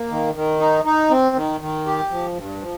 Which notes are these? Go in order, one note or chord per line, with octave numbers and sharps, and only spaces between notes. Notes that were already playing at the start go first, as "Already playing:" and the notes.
Already playing: A#3
D#3
D#3
D#4
D#4
C4
D#3
D#3
G4
F3
G2
F3